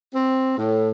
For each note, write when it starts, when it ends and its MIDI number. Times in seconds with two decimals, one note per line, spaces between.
0.14 0.54 60
0.58 0.90 45